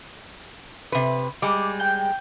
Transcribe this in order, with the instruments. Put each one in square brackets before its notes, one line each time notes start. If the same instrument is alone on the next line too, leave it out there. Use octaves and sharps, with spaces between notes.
[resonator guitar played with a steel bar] C3 B4
[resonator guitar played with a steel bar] G3 G#3 [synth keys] D6
[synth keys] G5 G6